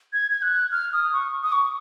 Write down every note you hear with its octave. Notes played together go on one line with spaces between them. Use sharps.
G#6
G#6
F#6
F6
D#6
C#6
D#6
C#6